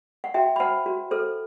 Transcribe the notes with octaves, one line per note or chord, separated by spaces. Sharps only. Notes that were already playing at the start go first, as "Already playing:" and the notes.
F#5
F#4 E5 G5
B5
C5 F#5 A5
F#4
A4 C5